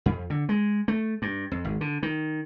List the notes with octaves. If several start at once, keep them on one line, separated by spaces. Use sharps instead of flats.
F2
D3
G#3
A3
G2
F2
G#1
D3
D#3